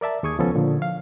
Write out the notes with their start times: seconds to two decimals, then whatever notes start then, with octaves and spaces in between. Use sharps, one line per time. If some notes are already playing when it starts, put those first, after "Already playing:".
0.01 A#4 D5 E5 A5
0.23 D#2 G#4 C#6 D#6 G#6
0.38 C#2 F3 B3 C#4 A4
0.55 A#2 D3 F3
0.82 F5